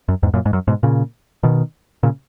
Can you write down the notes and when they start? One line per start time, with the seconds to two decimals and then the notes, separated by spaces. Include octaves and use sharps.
0.08 F#2
0.23 E2 G#2
0.34 F#2 A#2
0.46 G#2
0.53 F#2
0.68 G#2 B2
0.83 A#2 C#3
1.43 B2 D#3
2.03 A#2 C#3